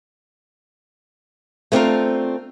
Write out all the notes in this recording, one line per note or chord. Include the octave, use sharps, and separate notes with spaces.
A3 B3 C4 D4 F4 A#4